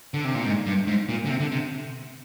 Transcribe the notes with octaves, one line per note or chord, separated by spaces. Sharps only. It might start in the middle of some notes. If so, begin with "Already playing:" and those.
D3
C3
A#2
G#2
G2
G#2
A#2
D3
C3
D3
C3